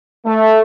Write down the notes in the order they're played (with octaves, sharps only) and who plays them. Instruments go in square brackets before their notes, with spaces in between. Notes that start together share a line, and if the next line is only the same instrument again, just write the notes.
[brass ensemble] A3